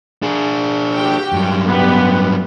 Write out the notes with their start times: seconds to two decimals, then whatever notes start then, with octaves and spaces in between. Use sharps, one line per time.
0.22 D4 G#4
0.95 F#4 G4 G5
1.33 G2 F#3
1.69 G3 B3 G4